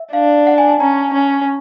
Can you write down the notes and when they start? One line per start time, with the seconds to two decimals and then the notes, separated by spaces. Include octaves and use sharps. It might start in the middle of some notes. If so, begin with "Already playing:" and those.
Already playing: E5
0.13 D4 F5
0.47 F#5
0.58 G#5
0.69 A5
0.80 C#4 A#5
1.14 C#4